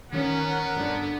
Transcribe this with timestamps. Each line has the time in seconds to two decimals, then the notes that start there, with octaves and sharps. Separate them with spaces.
0.13 D#3 B3 C#4 A#4 F#5
0.76 G1 D3